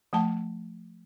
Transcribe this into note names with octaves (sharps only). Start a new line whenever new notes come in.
F3 A3 F#5 A5